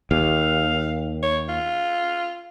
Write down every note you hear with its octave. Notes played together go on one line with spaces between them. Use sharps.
D#2 F5
C#5
F4